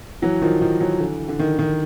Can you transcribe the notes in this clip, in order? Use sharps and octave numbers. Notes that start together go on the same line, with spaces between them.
E3 F#3
D#3 F3
D#3 F3
E3 F#3
D3 E3
D3
D#3
D#3